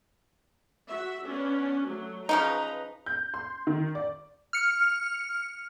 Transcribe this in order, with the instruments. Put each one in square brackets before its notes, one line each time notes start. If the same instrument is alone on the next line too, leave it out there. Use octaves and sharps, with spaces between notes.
[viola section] F#4 E5
B3 C#4 D4
F#3 A3
[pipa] C#3 F3 D#4 [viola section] B4 A#5
[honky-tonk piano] G6
C6
D#3
D5
[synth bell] F6 C#7